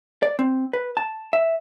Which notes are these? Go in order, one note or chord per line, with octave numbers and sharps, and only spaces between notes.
D5
C4
B4
A5
E5